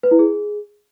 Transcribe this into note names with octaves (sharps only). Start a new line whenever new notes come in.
B4
E4
G#4